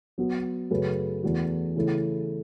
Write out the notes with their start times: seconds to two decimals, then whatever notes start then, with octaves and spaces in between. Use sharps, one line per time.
0.18 F#3 B3 F#4
0.71 F#2 C#3 A3 F#4 B4
1.23 E2 E3 A3 F#4
1.76 C#3 E3 A3 E4